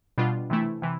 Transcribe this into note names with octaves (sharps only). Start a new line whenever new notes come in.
B2 G3 D4 F4
C3 E3 A3 E4
C3 E3